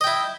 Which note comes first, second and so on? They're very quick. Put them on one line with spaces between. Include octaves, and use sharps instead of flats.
D#5 G5 E4